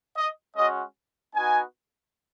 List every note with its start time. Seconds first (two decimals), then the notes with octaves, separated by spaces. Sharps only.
0.16 D#5
0.55 G#3 C#4 F#4 D#5
1.35 B3 D#4 F#4 G#5